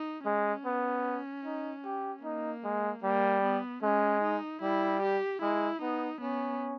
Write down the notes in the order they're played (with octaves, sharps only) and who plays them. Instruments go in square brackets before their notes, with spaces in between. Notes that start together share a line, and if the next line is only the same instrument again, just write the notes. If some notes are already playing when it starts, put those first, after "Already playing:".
Already playing: [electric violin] D#4
[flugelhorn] G#3 [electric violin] C#4
[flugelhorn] B3
D#4
G4
[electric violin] A#3 [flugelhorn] D#4
[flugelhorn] G#3
[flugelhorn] G3 [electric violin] A#3
[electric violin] B3
[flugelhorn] G#3 [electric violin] C#4
[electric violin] D#4
[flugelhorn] G3 [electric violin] E4
[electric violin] G4
[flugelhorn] G#3 [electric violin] E4
[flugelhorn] B3 [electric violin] D#4
[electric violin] B3 [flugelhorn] C#4